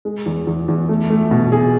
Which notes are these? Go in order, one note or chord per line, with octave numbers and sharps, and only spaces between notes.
G#3
E2
E2
E2
A3
A3
B2
G#4